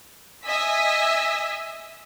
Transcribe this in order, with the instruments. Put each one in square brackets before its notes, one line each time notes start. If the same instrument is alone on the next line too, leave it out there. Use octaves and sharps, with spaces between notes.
[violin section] D#5 E5 G#5 E6 B6